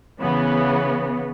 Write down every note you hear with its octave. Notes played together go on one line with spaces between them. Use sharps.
C#3 E3 B3